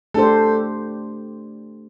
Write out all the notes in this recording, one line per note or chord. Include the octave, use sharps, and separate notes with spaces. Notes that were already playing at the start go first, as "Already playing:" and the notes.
A3 D4 G4 A4 C5